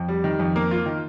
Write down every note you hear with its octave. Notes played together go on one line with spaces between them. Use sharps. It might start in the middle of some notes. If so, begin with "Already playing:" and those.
Already playing: F2
G3
D#3
F2
A#3
F4
D#3